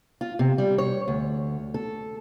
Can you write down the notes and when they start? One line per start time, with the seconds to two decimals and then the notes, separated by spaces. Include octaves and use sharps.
0.21 F4
0.39 C3
0.58 G3
0.78 C#5
1.08 D2
1.74 A4